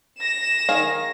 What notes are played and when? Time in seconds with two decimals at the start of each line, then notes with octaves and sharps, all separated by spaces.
0.20 A#6 E7
0.69 D#3 G#4 F5